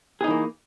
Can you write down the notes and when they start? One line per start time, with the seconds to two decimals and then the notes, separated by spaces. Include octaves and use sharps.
0.21 G#4
0.24 D#4
0.27 E3
0.31 A#3